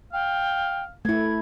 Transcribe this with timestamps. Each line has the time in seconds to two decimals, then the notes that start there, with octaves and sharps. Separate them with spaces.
0.13 F5 G5
1.05 A3 E4 G#6